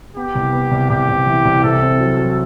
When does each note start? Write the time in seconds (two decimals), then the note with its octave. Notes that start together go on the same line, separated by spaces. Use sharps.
0.16 B3 G4
0.35 C2
0.53 B3
0.71 C2
0.90 C2 G4
1.09 C2
1.27 E3
1.45 C2
1.64 C3 A4
1.82 C4
2.00 F#3
2.18 F#3